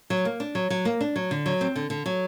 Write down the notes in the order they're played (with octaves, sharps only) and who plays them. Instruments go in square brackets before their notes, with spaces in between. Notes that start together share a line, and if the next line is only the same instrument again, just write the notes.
[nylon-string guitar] F#3
A#3
D4
F#3
F#3
A#3
D4
F#3
D3
F#3
C4
D3
D3
F#3